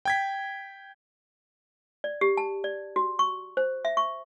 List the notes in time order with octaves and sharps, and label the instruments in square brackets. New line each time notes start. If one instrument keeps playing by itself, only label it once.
[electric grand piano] G5 G#6 B6
[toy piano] D5
G4
A5
D5
F#4
C#6
C5
E5
C#6